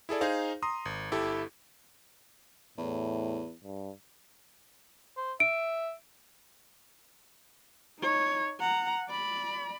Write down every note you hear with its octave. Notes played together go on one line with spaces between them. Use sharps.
E4 G#4 A4 D5
D#4 G#4 C5 F5
A#5 C6 D#6
G#1
G1 E4 G4 A4
E2 A2
G2
C5
E5 D7
D#4 C#5
F#5 A#5
D5 B5